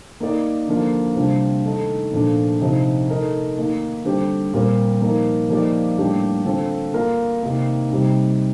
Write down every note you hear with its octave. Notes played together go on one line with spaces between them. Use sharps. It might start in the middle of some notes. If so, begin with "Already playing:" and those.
A#3 D#4 A#4 D5
D3 F3 A#3 F4
C3 G3 D4 F4 C5
D#3 A3 D#4 A4
A#2 F3 A3 D4
C3 F3 C4 D#4
A3 D#4 A#4 D#5
D#3 A#3 D#4
D3 G3 C4 G4 C5
A#2 G3 C4 G4 A#4
F3 A#3 D#4 A#4
F3 A#3 D#4 G4 D5
A2 G3 A#3 D4 G4
D3 A3 C4 F4 A4
A#3 F4 A#4
C3 D#3 A#3 D#4
C3 G3 C4 D#4